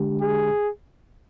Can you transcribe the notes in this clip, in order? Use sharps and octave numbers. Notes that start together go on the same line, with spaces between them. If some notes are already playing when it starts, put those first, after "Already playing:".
Already playing: D3 G#3 D4 G4
G#4